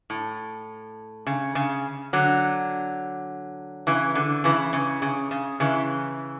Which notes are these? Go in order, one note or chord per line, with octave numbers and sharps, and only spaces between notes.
A2
C#3
C#3
D3 F#3
C#3 E3
D3
C#3 E3
C#3
C#3
C#3
C#3 E3